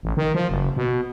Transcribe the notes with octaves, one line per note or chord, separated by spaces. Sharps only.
A1
D#3
F3
F#1
B2